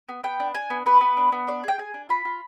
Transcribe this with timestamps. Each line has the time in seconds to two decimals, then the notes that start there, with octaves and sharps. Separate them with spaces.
0.09 B3
0.24 B3 G5
0.40 D4
0.55 D4 G#5
0.70 B3
0.86 B3 B4
1.01 B3
1.17 D4
1.32 B3
1.47 D4 D5
1.64 G#4 G5
1.78 G#4 G#5
1.94 D4
2.09 F4 B5
2.25 F4